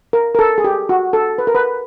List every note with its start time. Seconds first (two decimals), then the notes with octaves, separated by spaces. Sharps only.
0.13 A#4
0.35 A#4
0.39 A4
0.58 G#4
0.64 G4
0.89 F#4
1.13 A4
1.38 B4
1.47 A#4
1.55 B4